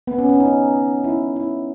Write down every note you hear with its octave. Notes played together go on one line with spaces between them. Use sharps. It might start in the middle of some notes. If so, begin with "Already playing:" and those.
B3
C#4
C#4
D#4
E4
E4